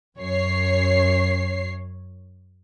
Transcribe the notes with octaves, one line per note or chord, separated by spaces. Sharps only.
F#2 C#5 C7